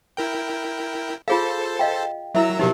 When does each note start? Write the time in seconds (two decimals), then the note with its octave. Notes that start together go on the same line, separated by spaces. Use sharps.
0.17 E4 A#4 G5
1.28 F4 G#4 A4 C5 F5 A5
1.79 D#5 F5 G5
2.35 F#3 E4 A#4 E5 A#5 E6
2.59 B2 F3 F#3 D#4 G4 A#4